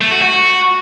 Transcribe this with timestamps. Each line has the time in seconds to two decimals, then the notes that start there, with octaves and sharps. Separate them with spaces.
0.01 A3
0.11 F#4
0.22 F#4